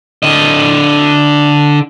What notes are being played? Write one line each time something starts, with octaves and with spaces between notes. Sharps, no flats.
D3 D#5